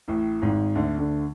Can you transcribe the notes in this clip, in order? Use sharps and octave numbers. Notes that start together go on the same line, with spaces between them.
A1 A2
G#1 G#2
D2 D3
D2 D3